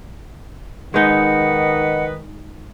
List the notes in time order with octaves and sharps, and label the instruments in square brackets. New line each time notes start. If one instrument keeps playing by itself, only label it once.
[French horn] D#3 [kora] G#3 D#4 [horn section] B4 D#5 [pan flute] F#5